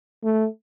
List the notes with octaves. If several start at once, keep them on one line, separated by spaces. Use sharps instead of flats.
A3